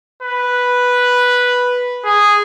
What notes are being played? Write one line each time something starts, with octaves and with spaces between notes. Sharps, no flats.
B4
G#4